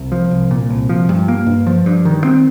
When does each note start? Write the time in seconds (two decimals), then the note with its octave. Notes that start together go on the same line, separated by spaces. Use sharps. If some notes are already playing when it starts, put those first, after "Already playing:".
Already playing: C2
0.12 F3
0.31 C2
0.51 A#2
0.70 C2
0.89 F3
1.09 G2
1.28 A#3
1.46 G2
1.67 F3
1.86 G2
2.05 D#3
2.24 C4